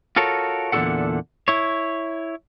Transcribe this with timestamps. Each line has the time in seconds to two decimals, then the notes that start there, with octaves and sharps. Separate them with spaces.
0.16 F4 F#4 A4 A#4 C#5
0.72 E2 A#2 D3 F#4 A4 F#5
1.48 E4 C#5